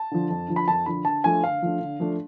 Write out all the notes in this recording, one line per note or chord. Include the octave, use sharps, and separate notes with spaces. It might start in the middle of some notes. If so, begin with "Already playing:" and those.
Already playing: A5
D3 F3
F2
D3 F3
B5
F2 A5
D3 F3 B5
D3 A5
F3 A3 D4 G#5
D3 F5
F3 A3 D4
D3
F3 A3 D4